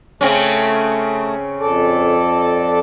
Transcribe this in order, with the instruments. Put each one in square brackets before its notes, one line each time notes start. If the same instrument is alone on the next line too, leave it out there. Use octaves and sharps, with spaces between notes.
[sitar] C#3 C4 C#4 [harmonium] A3
[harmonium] F2 A4 D5